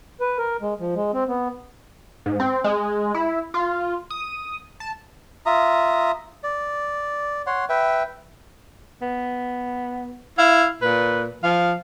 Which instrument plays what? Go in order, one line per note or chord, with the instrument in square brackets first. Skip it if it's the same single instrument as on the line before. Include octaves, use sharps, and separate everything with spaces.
[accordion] B4
A#4
G#3
F3
G#3
C4
B3
[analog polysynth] G#2
C4
G#3
E4
F4
D#6
A5
[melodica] F4 E5 A#5 D#6
D5
C#5 F#5 C6
B4 E5 G5
[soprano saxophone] B3
[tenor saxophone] E4 [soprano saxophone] F5
[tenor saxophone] A#2 [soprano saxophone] B4
[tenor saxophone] F3 [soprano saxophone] F5